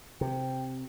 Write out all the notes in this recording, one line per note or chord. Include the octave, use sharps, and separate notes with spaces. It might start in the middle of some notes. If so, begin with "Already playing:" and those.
C3 G5